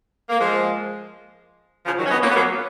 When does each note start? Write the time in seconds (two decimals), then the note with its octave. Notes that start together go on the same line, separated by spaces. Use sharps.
0.29 A#3
0.40 F3 G#3
1.86 C#3 F3
1.98 D#3 F#3
2.06 C#4
2.10 B3 D#4
2.22 A#3 C#4
2.30 B3
2.35 F#3 A#3